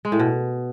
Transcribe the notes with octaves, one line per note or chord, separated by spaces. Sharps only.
G#3
A2
B2